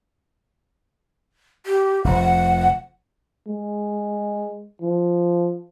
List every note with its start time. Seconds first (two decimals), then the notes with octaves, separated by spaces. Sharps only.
1.66 G4
2.04 F1 F3 F#5
3.47 G#3
4.82 F3